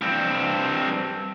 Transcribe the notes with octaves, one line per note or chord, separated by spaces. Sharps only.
G2 C4